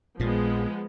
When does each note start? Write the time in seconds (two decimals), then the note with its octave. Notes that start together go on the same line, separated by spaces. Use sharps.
0.20 A#1 A#2 F3 G#3 B3